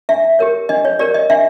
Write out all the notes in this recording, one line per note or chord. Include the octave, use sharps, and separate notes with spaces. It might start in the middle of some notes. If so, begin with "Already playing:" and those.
D4 E5
G4 A#4 C#5
D4 D#5
C#5
G4 A#4 C#5 D5
D#5
D4 E5